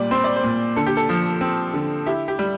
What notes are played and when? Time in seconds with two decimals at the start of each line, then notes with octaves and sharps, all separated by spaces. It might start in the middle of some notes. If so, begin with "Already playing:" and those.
Already playing: A#2 G3 D5
0.11 C4 C5
0.24 D5
0.36 C5
0.43 A#2
0.76 D3 A4
0.86 G4
0.97 A4
1.09 F3
1.41 C4
1.74 D3
2.06 E4 G4
2.28 G4
2.39 G3